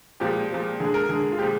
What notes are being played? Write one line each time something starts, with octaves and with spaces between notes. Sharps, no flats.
A#2 F3 G#3 G4
A#2 F3 G#3
D3 G#3 G#4
A#4
D3 G#3 G#4
F4
A#2 F3 G#3 G4